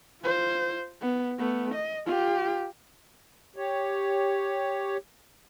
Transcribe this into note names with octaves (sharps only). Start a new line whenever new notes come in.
F4 C5
B3
A3 B3
D#5
F4 G4
G4 C#5